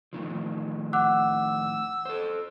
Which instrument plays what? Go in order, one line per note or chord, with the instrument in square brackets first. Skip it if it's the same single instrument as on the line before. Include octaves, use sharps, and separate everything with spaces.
[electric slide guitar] A2 D#3 F3
[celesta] F#5 D6 F#6 [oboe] E6
[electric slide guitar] A4 C5